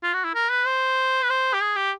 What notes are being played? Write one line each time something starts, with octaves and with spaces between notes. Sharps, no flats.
F4
F#4
E4
A#4
B4
C5
B4
C5
G4
G#4
G4